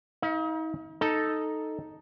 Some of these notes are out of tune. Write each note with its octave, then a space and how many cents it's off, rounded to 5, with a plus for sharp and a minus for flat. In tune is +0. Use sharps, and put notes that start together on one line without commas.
D#4 +40 F5 -5
D#4 +0 A4 +0